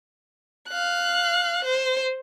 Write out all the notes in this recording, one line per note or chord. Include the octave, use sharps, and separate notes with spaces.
F5 F#6
C5